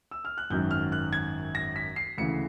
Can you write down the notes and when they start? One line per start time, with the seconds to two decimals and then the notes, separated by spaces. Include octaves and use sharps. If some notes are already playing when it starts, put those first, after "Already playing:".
0.11 E6
0.25 F6
0.38 F#6
0.50 G#1 F#2 D#3 F#3 G6
0.71 F6
0.92 F#6
1.13 G#6
1.55 A#6
1.76 B6
1.96 C7
2.18 D2 C#3 E3 C#7